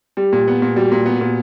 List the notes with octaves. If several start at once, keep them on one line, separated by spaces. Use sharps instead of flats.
G3 G4
A#2
B3
A#2
G3 F#4
A#2
B3
A#2